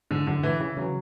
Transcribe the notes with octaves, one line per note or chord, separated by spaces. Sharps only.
G#2 D3
F#2 D3
A2 E3
C#3 E3
C#3 F#3